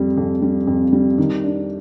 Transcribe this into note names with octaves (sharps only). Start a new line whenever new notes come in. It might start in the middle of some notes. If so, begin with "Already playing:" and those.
Already playing: F2 G3
F2
G3
F2
G3
D#3
D4